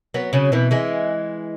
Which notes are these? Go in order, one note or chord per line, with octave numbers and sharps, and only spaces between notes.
F#3 B3
C#3 F#3
B2 E3
E3 G#3